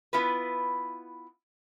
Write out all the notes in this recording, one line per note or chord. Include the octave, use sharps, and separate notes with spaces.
B3 E4 F4 B4